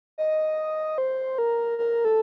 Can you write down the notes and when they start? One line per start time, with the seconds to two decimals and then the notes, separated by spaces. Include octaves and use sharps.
0.18 D#5
0.98 C5
1.38 A#4
1.78 A#4
2.05 A4